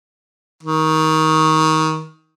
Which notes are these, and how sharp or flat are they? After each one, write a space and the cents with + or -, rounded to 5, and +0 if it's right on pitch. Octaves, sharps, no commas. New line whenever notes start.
D#3 +20